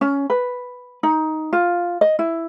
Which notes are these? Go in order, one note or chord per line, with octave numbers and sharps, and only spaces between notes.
C#4
B4
D#4
F4
D#5
E4